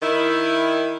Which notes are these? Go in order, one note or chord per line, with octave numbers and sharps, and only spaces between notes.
D#3 E4